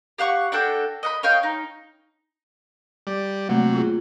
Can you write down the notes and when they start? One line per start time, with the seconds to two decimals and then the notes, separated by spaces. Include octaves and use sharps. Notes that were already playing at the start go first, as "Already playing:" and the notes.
0.18 G4 F5 F#5 C#6
0.52 D4 F#4 A4 G5
1.03 D#5 F#5 B5
1.23 C#5 D#5 F5 G5
1.43 D#4
3.07 G3 D5
3.49 C3 F#3 A3 A#3
3.74 F4 G#4